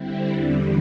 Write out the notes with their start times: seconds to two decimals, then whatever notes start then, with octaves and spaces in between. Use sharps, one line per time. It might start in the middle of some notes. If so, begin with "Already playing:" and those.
Already playing: D3 G3 C4 E4
0.28 E2 D3 G3